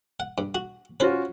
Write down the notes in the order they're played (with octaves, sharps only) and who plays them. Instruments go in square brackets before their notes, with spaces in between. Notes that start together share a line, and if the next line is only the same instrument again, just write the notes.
[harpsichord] F#5
G2
F#4
[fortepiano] C#4 F4 F#4 [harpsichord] B4 C5